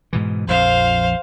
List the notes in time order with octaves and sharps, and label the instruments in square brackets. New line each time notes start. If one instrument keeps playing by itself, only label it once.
[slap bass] G#2 B2 E3
[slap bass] A#1 F2 [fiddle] C5 F5